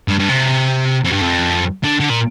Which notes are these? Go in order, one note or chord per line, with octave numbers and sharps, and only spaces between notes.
G2
G2
C3
F2
G2
F2
D3
D3
A#2